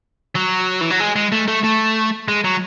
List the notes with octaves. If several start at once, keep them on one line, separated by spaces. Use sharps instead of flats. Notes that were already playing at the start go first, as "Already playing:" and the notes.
F#3
E3
F#3
G#3
G#3
A3
A3
A3
G#3
F#3